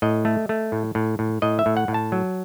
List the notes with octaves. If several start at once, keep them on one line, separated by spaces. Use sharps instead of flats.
A2 D#5
A3
A3
A2
A2
A2
A2 D#5
E5
A2
F#5
A2
A5
F#3